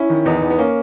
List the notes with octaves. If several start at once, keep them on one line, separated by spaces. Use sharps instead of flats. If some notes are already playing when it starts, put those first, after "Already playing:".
Already playing: C#4 E4
D#3
E2 B3 D#4
E2
B3
A#3 C#4